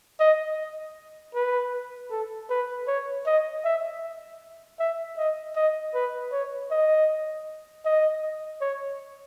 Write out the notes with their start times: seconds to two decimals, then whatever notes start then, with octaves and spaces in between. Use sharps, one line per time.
0.20 D#5
1.35 B4
2.11 A4
2.50 B4
2.88 C#5
3.26 D#5
3.65 E5
4.80 E5
5.18 D#5
5.56 D#5
5.94 B4
6.32 C#5
6.71 D#5
7.86 D#5
8.62 C#5